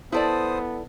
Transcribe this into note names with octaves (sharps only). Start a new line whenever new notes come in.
B3 E4 A4 C5 D5 D#6